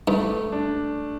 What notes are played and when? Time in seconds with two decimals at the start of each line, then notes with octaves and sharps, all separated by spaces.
0.08 G2 A3
0.52 D4